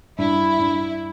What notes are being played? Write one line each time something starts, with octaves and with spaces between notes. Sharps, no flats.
G2 E4
G2